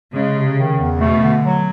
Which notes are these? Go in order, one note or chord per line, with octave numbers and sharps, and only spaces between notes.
C#3 G#3
C3
D#3
E2
B2 A3
D3
F#3